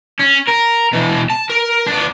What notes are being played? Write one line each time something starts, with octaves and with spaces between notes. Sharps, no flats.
C#4
A#4
B2 E3
A5
A#4
B3 D4